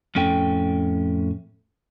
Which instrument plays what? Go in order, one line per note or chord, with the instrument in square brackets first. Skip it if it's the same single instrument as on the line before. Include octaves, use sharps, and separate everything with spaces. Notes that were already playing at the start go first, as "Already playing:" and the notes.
[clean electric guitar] F2 A2 C#4 A4 G5